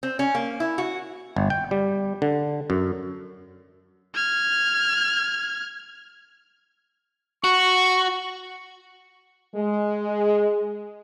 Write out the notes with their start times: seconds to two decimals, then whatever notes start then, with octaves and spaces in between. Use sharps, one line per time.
0.03 C4
0.19 C#4
0.35 A#3
0.60 E4
0.78 F#4
1.36 G1
1.50 G5
1.71 G3
2.22 D3
2.70 F#2
4.15 F6 G#6
7.44 F#4 C#6
9.56 G#3